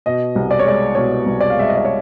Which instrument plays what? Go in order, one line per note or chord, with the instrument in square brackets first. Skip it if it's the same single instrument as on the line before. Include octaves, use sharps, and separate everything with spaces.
[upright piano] B2 D#5
C2
D5
C#5
G#3 D5
B2 C#5
C2
D5
F5
G#3 E5
D#5
D5
C#5